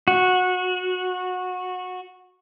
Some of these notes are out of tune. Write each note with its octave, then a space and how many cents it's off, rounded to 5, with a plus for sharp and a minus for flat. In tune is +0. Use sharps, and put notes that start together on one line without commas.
F#4 -20